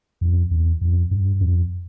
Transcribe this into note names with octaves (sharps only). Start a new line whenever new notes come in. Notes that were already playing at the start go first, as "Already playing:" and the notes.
F2
E2
F2
G2
F2